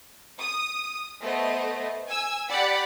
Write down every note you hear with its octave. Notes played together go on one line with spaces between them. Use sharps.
D#6
A3 B3 C5 D#5
G#5 E6
G4 D5 F#5 B5 B6